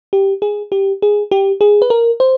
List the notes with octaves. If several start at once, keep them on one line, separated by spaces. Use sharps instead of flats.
G4
G#4
G4
G#4
G4
G#4
B4
A#4
C5